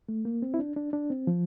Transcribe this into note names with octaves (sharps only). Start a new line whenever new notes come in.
A3
A#3
C4
E4
D4
D4
D4
C4
F3